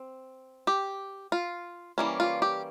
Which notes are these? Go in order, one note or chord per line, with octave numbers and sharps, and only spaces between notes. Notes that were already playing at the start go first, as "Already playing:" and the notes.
Already playing: C4
G4
F4
E3 G3 A#3 C#4
F4
G4